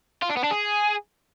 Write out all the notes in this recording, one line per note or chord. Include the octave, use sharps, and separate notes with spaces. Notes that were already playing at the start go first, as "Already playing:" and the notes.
F4
D4
B3
D4
G#4